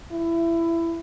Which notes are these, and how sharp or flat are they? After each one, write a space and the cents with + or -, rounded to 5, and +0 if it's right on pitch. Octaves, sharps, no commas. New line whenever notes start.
E4 +20